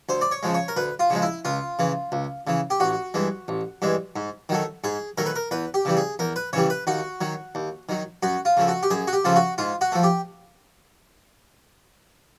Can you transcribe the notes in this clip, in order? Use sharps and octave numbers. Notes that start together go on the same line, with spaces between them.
D2 C5
D5
C#5
C#3 F3 G#3
C#5
A#4
D2 B4
F4
C#3 F3 G#3
E4
C#2 F4
C#3 E3
C#2
C#3 E3
G4
A1 F#4
G2 E3 G#3
A1
G2 E3 G#3
G#2
D#3 F#3 A3
G#2 G#4
D#3 F#3 A3 A#4
B4
A#4
E2 B4
G4
C#3 E3 G3
G#4
E2 A#4
B4
C#3 E3 G3 C#5
B4
D#2 F#4
D#3 F#3
D#2
D#3 F#3
F#2 F#4
F4
C#3 F3 A3
F#4
G4
F#2 G#4
F#4
G4
C#3 F3 A3 F4
F#4
G#2 F4
F#4
F3 A3
G4